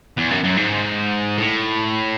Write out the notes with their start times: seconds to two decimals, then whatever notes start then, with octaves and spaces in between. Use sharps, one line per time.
0.18 E2
0.31 F#2
0.44 F#2
0.57 G#2
1.37 A2